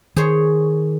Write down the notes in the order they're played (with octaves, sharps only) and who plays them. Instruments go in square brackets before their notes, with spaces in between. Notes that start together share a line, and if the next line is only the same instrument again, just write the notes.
[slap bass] D#3 [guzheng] G#4 C5 C#5